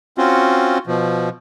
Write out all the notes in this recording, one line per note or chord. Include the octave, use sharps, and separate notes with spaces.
C4 C#4 F4 F#4
B2 F3